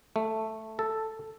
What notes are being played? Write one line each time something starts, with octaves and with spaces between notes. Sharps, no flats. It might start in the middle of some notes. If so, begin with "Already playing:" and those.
A3
A4